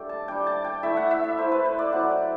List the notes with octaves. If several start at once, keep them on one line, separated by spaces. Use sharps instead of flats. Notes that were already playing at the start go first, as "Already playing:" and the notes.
Already playing: G3 A3 D4 A4 G5
A5
G3 D4 G5
A5
G5
A3 E4 E5
F#5
E5
E5
A3 E4 C5
B4
C5
D5
F#3 C4 E4 F#5
G5